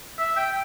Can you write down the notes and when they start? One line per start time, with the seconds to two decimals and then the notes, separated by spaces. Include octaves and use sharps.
0.19 E5
0.37 G5